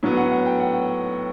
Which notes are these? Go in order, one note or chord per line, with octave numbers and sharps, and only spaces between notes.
A2 F#3 B3
F#5
F#5
G5
F#5